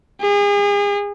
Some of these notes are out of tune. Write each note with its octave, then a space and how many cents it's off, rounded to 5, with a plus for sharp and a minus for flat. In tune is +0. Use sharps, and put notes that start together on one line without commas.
G#4 -35